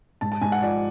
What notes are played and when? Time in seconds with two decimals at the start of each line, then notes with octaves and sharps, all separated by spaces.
0.21 G#2 A5
0.32 A5
0.41 G#2 G#5
0.52 F#5
0.62 F3 D5